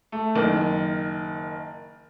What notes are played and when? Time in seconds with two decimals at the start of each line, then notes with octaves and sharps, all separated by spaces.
0.12 A3
0.35 F#1 D#3